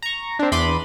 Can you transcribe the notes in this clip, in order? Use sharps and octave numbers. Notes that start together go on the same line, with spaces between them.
A#5 C#6
C4 D4
E2 B5 C6 D6 D#7